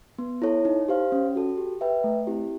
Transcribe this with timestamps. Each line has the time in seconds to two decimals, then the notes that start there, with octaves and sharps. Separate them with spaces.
0.19 B3
0.42 E4 A4 C#5
0.65 D#4
0.88 G4 C5 F5
1.12 C#4
1.36 F#4 A4
1.57 G4
1.81 B4 E5 G5
2.04 A3
2.27 C4 E4 G4